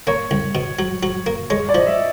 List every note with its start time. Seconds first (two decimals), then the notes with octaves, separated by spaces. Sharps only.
0.07 A#3 C#5
0.31 C2
0.55 B2
0.79 F#3
1.03 F#3
1.26 A#3
1.50 G#3 C#5
1.69 D5
1.75 F3 D#5
1.87 E5